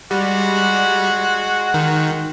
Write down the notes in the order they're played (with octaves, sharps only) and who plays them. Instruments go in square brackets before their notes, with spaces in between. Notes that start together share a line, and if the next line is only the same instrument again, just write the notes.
[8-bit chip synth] G3 [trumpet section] G#3 F#4
[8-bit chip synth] D#3